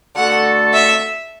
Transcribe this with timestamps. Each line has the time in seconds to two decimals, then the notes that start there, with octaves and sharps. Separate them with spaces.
0.15 D3 A3 F#4 A4 F#5
0.73 E5